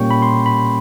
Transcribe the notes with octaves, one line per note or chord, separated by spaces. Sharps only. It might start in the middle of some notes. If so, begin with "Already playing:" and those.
Already playing: A#2 G3 A#3 C#4 G5 C#6
B5
C6
B5